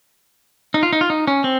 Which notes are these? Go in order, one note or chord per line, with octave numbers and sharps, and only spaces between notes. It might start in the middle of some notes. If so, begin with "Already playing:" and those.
D#4
F4
D#4
F4
D#4
C#4
C4